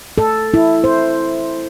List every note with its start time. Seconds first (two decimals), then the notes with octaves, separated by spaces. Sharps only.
0.18 A4
0.54 E4
0.84 C5